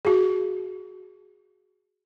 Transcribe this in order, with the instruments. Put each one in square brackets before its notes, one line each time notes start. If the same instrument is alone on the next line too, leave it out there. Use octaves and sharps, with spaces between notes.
[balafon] F#4 G#4